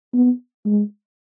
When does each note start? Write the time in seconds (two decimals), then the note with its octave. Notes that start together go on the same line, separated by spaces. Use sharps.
0.14 B3
0.65 G#3